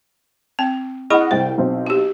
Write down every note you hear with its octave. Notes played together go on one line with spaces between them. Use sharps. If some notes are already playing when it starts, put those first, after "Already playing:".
C4 G5
E4 G#4 D#5 F#5 B5
C2 C5 G5
B1 C4
F#4 G4